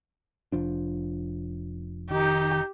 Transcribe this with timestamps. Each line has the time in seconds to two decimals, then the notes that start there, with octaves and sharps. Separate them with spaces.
0.52 F1 F3 D4
2.11 D#3 D#4 G4 G6